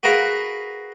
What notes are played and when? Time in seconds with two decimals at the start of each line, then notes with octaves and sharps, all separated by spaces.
0.03 F#4 G#4 A#4 B4 F5